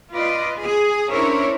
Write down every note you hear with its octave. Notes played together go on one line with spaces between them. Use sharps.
F4 B4 D5 D#5
G#4
C#4 D4 E4 A#4 C5 C#5